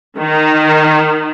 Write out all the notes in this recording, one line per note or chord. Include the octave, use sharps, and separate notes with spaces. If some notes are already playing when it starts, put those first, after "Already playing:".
D#3